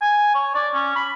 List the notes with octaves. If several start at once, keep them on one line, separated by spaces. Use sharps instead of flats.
G#5
C#5
D5
C#4
B5